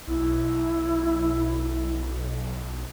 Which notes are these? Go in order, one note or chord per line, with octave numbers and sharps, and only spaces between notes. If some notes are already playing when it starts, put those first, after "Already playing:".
B1 E4